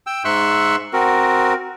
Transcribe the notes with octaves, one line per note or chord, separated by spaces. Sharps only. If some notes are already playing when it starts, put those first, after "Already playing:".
G5 E6
G#2 E5 C6 C#6 E6 F#6
C4 F#4 A#4